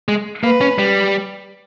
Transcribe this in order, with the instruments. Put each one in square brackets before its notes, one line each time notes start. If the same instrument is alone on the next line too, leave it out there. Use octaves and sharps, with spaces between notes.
[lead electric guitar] G#3
[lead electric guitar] A#3 [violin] B4
[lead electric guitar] C#4
G3